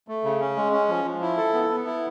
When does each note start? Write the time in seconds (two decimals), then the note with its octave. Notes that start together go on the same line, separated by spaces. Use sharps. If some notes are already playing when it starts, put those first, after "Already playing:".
0.08 A3
0.24 C#3
0.40 C#4
0.57 G#3
0.73 C#4
0.89 F3
1.05 F3
1.22 E4
1.37 A4
1.54 B3
1.70 B3
1.86 E4